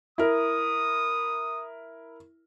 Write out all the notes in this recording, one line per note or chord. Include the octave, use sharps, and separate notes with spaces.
E4 A#4 D#6